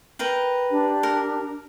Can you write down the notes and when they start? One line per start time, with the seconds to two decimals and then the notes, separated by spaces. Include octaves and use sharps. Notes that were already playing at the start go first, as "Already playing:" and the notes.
0.19 A#4 B4 G5
0.70 D4 G4
1.03 A#4